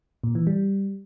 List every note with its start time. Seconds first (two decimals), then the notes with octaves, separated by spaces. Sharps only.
0.24 A#2
0.35 E3
0.47 G3